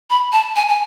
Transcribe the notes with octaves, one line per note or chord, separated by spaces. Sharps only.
B5
A5
G#5
G#5